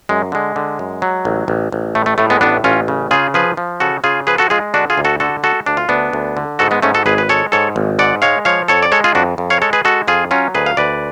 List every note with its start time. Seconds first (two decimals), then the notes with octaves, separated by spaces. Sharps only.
0.09 F#2 G#3
0.32 D3 G#3
0.56 D3
0.79 F#2
1.02 F#3
1.25 A1
1.48 A1
1.72 A1
1.95 A2 A3
2.06 A3
2.18 A2 A3
2.30 G#3 B3
2.41 A1 B3 D4
2.64 A1 C#4 F4
2.88 C#3
3.11 C#3 F4 G#4
3.34 F3 G#4 B4
3.57 F3
3.80 C#3 F#4 A4
4.04 C#3 F4 G#4
4.27 F3 G#4 B4
4.38 F#4 A4
4.50 G#3 F4 G#4
4.74 D3 D4 F#4
4.90 F4 G#4
4.98 D2
5.05 F#4 A4
5.20 D3 F#4 A4
5.43 G#3 F#4 A4
5.66 D2 D4
5.77 F4
5.89 D2 B3 D4
6.13 D2
6.37 D3
6.59 G#2 F#4 A4
6.71 G#3 B3
6.82 G#2 A3 C#4
6.94 F#4 A4
7.06 G#1 G#4 B4
7.18 B4
7.29 G#3 A4 C#5
7.52 G#2 A4 C#5
7.76 G#1
7.99 G#2 D5 F#5
8.22 G#3 C#5 F5
8.45 F3 C#5 F5
8.68 F2 A4 C#5
8.83 D5
8.92 G#3 A4 C#5
9.04 F4 G#4
9.15 F2 D4 F#4
9.38 F2
9.50 C#5 F5
9.62 G#3 A4 C#5
9.73 G#4 B4
9.85 G#3 F#4 A4
10.08 F2 F4 G#4
10.31 F#3 C#4 F4
10.55 D2 G#4 B4
10.66 F5
10.77 D2 B4 D5